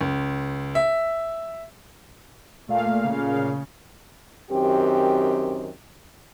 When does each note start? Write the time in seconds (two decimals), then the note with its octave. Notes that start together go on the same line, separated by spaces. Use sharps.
0.01 C#2
0.75 E5
2.69 A#2 A3 F5
3.04 C#3
4.51 F#2 D#3 C4 G4